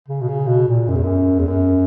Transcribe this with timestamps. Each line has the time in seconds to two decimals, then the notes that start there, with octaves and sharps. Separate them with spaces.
0.08 C#3
0.21 B2
0.28 C#3
0.47 B2
0.68 A#2
0.88 F#2
0.95 E2
1.03 F#2
1.39 E2
1.48 F#2